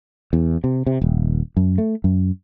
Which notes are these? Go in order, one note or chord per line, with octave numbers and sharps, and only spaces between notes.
E2
C3
C3
D#1
F#2
A3
F#2